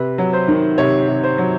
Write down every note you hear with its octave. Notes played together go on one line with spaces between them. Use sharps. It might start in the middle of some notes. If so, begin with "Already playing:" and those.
Already playing: C3 B4
F#3
C5
D#3
C3 C#5
C3
C5
F#3